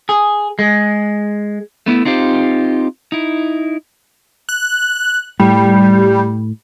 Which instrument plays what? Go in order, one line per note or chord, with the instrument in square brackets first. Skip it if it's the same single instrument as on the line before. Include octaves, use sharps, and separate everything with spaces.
[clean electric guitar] G#4
G#3
[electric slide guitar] A3 B3 C#4 E4
C4 D#4 F4 G4 C5
D#4 E4
[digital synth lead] F#6
[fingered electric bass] A2 [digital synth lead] G3